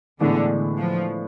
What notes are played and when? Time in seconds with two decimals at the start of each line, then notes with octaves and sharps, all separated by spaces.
0.20 A2 D3 E3 G#3 B3 D4
0.78 F3